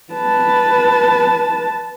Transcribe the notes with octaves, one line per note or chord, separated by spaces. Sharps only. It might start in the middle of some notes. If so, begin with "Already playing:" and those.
B4 A5